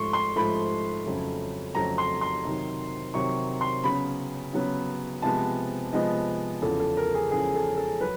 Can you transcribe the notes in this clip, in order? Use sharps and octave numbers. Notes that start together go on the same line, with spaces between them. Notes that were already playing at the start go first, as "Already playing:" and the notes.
Already playing: G#2 F3 A3 C6 C#6
C6
G#2 F3 A3 B5
F2 C#3 F#3 A3
F2 C#3 F#3 A3 A#5
C6
C6
C3 D#3 F#3
C3 D#3 F#3 C#6
C6
C#3 F#3 B3 B5
C#3 F#3 B3
C3 F3 G#3 B3 A5
C3 F3 G#3 B3 D#5
E2 C#3 F3 A4
A4
A#4
G#4
E2 C#3 F3 G#4
A4
A4
F#3 B4